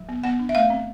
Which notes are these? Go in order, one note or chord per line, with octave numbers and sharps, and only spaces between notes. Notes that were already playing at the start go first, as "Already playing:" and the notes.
Already playing: F#3
B3
B3 F#5
D4
E5
A3 F5
C4